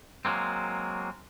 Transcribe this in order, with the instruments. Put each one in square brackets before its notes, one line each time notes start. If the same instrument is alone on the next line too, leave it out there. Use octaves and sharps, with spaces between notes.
[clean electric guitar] F#3 G#3 A#3 C4